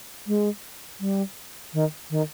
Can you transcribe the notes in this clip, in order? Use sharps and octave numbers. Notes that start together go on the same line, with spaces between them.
G#3
G3
D#3
D#3